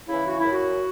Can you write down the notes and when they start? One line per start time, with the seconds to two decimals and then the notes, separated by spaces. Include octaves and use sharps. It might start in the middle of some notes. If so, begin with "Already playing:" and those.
0.08 C#3 E3 E4
0.27 F#4
0.40 F#2 E4
0.52 F#4